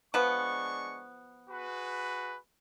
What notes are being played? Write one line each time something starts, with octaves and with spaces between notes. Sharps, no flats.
F3 G#3 B3 D4 C#6
F#4 G#4 B4